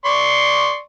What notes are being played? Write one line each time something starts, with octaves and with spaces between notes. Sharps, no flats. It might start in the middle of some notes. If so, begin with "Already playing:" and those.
D5 C6 C#6